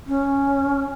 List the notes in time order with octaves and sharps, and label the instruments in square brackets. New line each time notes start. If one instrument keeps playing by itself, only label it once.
[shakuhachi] C#4